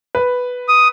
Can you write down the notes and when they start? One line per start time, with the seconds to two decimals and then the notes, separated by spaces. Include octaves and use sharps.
0.15 B4
0.69 D#6